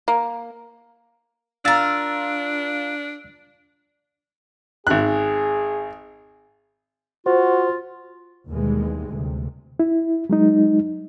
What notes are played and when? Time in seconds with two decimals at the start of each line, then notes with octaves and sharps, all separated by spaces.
0.08 A#3
1.65 D4 F4 A#4 E6 A6
4.87 G#1 G#4 F#6
7.26 F4 F#4 C5
8.49 D#2 B2 E3 G3 G#3
9.10 D2 C3
9.80 E4
10.30 F#3 G#3 D#4